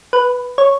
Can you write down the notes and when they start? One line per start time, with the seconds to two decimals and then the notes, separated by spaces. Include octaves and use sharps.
0.13 B4
0.58 C#5